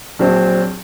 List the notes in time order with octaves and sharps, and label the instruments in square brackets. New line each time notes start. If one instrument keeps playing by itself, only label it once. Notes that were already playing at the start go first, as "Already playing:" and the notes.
[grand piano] A#1 A#2 F#3 C4